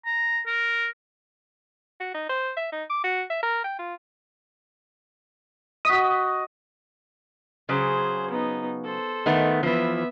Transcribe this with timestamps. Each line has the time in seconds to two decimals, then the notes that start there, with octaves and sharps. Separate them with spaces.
0.06 A#5
0.46 A#4
2.00 F#4
2.14 D#4
2.29 C5
2.57 E5
2.72 D#4
2.90 D6
3.04 F#4
3.30 E5
3.43 A#4
3.64 G5
3.79 F4
5.85 F#4 D#5 D#6 B6
7.69 C#3 F#3 G#4 C5
8.30 B3 D#4
8.84 A4 C5
9.26 D#3 A3 B3
9.63 E3 F3 B3 E5